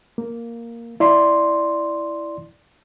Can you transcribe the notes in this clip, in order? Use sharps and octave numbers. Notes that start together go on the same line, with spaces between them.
A#3
E4 D5 C6